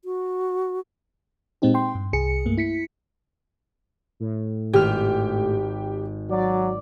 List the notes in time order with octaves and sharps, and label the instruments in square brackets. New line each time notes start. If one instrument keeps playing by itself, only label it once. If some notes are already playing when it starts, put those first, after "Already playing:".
[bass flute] F#4
[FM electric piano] A#2 G#3 C4 D#4 G4
G5 C6
G2
C2 G#4 C#7
G2 A3 A#3
E4 B6 C#7
[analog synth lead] A2
[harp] G#1 F6 [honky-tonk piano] G4
[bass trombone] F#3 [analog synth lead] D5